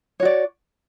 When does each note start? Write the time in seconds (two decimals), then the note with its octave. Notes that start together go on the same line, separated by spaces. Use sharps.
0.20 C#5
0.22 F#4
0.25 D5